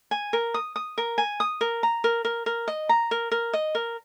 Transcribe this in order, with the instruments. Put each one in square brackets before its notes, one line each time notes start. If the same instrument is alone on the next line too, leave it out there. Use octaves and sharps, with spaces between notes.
[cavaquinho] G#5
A#4
D#6
D#6
A#4
G#5
D#6
A#4
A#5
A#4
A#4
A#4
D#5
A#5
A#4
A#4
D#5
A#4